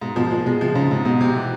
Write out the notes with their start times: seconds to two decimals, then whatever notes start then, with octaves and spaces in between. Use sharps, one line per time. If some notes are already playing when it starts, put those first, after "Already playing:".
0.02 G#2 B2
0.16 B2 F3
0.31 A#2 G#3
0.46 B2 G#3
0.61 C3 F3
0.75 G#2 C#3
0.90 G#2 C3
1.05 G#2 B2
1.21 C3
1.36 E3